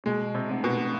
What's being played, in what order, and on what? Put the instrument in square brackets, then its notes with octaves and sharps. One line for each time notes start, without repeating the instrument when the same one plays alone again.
[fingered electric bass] B2 [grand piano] G#3
[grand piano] C3
[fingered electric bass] A3 C4
[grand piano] B2